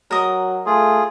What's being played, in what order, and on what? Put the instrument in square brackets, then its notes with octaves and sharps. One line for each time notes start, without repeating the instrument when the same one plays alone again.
[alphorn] F#3 [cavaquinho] A#4 D#5
[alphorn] A3 [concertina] F4 G#4